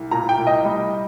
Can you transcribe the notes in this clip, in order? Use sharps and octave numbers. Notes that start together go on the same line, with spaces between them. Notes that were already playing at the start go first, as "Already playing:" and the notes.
Already playing: C2
A#2 A#5
G5
C2
D#5
G3